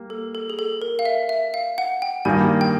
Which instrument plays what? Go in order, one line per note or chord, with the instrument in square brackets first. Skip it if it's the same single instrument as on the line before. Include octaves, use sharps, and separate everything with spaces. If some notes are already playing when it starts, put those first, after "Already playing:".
Already playing: [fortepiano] G3 A#3
[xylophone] A4
A4
G#4
A4
A#4
F5
E5
E5
F5
F#5
G5
[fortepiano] G2 D#3 G3 A#3 [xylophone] G#5
[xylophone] G5